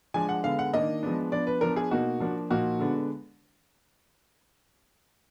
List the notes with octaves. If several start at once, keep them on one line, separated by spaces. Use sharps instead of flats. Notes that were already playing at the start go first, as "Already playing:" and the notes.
F3 G#3 D4 G#5
F#5
D3 G#3 B3 F5
F#5
D#3 A#3 D4 D#5
F3 G#3 B3 D4
F3 B3 D4 D5
B4
F3 B3 D4 A#4
G#4
B2 A#3 D#4 F#4
F3 A#3 D4
A#2 F3 A#3 D#4 F#4
D3 G#3 B3 D4